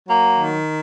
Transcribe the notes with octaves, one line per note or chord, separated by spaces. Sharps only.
F#3 A#3
D#3